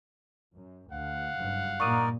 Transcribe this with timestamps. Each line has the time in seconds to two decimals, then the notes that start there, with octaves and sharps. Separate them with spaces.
0.56 F#2
0.92 D2 F5 F#5
1.37 F#1 G2
1.80 G2 A#2 D#4 A#4 D5 C#6 D#6 D#7